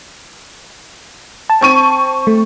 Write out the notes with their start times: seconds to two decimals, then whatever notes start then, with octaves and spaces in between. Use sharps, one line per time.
1.50 A5
1.61 C4 C#6 D#7
2.27 A3